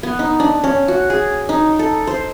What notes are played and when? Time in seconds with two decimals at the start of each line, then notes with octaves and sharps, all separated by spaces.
0.03 B3
0.19 D#4
0.40 D4
0.64 C#4
0.88 F#4
1.10 G#4
1.49 D#4
1.79 A4
2.07 C5